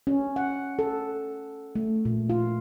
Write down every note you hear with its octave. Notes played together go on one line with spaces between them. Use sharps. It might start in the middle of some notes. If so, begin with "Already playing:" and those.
C#4
F#5
A4
A3
A#2
F4